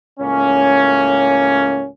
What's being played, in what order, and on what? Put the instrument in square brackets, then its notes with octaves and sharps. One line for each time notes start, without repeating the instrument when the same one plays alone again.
[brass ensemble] C#2 A2 A#3 C#4